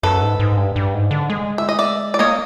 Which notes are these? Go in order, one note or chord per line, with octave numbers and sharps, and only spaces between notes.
F#2 A4 B4
G#2
G#2
G2
G2
G#2
D3
G#3
E5
D#5
D5 E5
D5
A#3 C#5 D#5